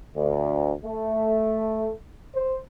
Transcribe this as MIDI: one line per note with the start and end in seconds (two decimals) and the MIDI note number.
0.16 0.71 38
0.84 1.90 57
2.34 2.59 72